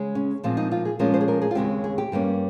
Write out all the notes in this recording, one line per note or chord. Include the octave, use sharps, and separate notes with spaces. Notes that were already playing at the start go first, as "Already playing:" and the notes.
Already playing: C#3 G#3
C#4
A#2 F3 G#3 C4
D#4
F4
G#4
A#2 F3 G#3 C#4 A#4
C5
G#4
A#4
G#4
F4
D#2 C#3 G#3 C4 G4
G#4
G4
G2 G3 A#3 C#4